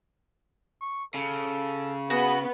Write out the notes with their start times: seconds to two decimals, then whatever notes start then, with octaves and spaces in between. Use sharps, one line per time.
0.81 C#6
1.14 C#3 A4
2.10 B3 F#4 G#4